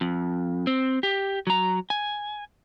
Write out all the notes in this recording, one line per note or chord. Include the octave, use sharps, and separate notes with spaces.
F2
C4
G4
F#3 A#5
G#5